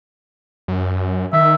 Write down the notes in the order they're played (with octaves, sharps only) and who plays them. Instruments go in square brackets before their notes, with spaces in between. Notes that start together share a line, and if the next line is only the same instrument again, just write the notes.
[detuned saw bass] F#2
[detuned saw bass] D#3 [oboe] E5